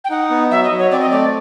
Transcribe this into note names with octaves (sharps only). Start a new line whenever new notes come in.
G5
D#4 F#5
B3
F#3 E5
D#5
F#3
C#5
C4 D5
D#5
A3 D5